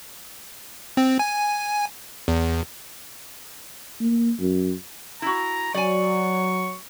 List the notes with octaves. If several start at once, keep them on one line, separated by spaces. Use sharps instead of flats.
C4
G#5
E2
A#3
F#2
E4 F#4 A#5
F#3 D5 G#5 C#6